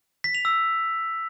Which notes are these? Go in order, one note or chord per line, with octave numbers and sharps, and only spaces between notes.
B6
F7
E6